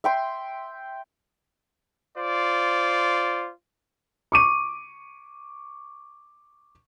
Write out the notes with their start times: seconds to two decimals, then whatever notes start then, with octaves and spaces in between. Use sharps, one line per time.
0.04 E5 G5 C6
2.17 F4 C5 D5
4.32 C#6 D6 D#7